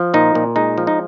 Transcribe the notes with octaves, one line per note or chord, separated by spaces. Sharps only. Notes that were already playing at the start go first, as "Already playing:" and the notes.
Already playing: F3
A#2 D#4
A#2
G#3 D#4
F3
D#4